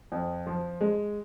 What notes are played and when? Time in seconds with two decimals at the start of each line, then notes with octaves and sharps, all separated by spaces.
0.12 F2
0.47 F3
0.81 G#3